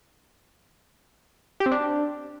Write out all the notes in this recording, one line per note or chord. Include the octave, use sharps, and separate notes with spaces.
G4
C4
D4